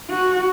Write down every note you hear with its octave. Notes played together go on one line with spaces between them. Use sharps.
F#4